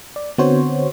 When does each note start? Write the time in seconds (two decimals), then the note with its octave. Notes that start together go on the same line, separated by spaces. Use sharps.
0.16 D5
0.38 D3 B3 C4 F#4 C5 C#5